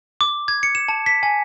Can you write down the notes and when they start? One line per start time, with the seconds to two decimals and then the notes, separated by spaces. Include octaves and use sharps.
0.21 D6
0.48 G#6
0.63 C#7
0.75 E7
0.88 A5
1.06 B6
1.23 G#5